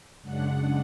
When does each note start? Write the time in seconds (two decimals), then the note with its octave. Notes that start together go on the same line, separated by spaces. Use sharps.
0.22 F#2 C#3 G#3 D4 F#5